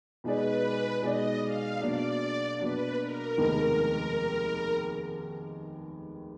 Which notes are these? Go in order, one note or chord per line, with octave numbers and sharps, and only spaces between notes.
B2 G#3 D#4 G#4 B4 D5
B2 G#3 D#4 G#4 D5 D#5
F5
B2 F#3 A#3 D4 D5
B2 F#3 A#3 D4 B4
A#4
F1 D#2 D#3 G#3 B3